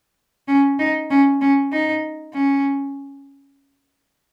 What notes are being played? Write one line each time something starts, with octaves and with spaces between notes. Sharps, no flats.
C#4
D#4
C#4
C#4
D#4
C#4